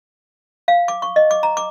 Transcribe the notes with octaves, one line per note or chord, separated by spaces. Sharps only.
F5
D6
C#6
D#5
D6
A#5
D6